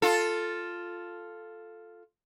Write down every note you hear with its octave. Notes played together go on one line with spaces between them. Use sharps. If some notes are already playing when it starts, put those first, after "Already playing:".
F4 A4